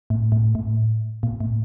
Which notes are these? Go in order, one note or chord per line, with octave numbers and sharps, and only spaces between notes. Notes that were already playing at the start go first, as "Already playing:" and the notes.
A2
A2
A2
A#2
A2